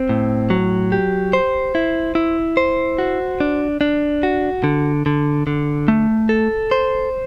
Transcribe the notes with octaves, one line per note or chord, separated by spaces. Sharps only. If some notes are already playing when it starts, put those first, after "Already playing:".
Already playing: C4
A2
F#3
G4
C5
E4
E4
C5
F#4
D4
D4
F#4
D3
D3
D3
A3
A4
C5